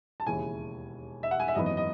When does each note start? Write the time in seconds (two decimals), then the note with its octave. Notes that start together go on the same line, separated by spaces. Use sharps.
0.20 A5
0.26 E1 D#2 C#3 E3 G#5
1.23 E5
1.31 F#5
1.40 G#5
1.48 E5
1.55 G#1 F#2 E3 B3 D#5
1.66 D#5
1.77 D#5